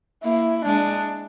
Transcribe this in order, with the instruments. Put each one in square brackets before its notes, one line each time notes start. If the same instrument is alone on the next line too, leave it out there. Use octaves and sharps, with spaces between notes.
[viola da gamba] A#3 [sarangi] E4
[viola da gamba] G#3 [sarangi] D4